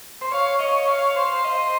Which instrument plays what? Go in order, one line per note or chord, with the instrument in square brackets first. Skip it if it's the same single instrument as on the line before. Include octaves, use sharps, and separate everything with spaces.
[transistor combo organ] C5
[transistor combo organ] C#5 [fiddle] F5
[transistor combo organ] C#5 [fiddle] D#5
[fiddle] F5
[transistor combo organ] C5
[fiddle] D#5